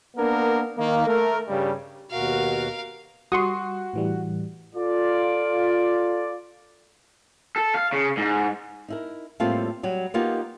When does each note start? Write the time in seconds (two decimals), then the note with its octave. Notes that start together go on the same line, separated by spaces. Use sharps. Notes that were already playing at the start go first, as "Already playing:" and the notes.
0.17 A#3 B3 D4 A#4
0.77 D#3 A#3
1.06 A3 A#4
1.48 G2 C#3 G3
2.11 D#2 B2 F#4 A#4 F5
3.32 G3 F#4 C6 C#6 D#6
3.93 A2 E3 G3
4.75 F4 A4 D5
7.56 A4
7.74 F5
7.92 C#3
8.17 G#2
8.88 D#4 E4 A#4
9.40 A2 G3 A3 A#3 C4 F4
9.83 F#3 G3
10.14 A#3 B3 D#4 F4 G4 A#4